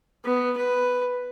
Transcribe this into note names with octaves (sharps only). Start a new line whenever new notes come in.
B3
B4